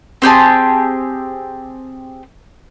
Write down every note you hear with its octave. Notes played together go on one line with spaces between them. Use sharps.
C4 G4 G#4 A5